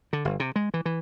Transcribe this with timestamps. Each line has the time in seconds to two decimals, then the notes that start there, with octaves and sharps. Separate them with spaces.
0.13 D3
0.25 G1
0.40 C3
0.56 G#3
0.74 E3
0.86 E3